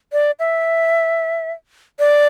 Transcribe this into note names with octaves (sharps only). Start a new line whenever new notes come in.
D5
E5
D5